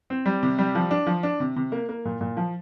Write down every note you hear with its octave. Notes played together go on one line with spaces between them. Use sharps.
C4
G3
C3
G3
F3
D4
F3
D4
C3
C3
A#3
A#3
A#2
A#2
F3